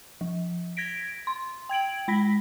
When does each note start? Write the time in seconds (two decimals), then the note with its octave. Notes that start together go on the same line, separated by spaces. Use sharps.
0.21 F3
0.77 G#6 A#6 B6 D7
1.27 C6
1.69 G5 G#6 D7 F#7
2.08 G#3 B5 A#6 B6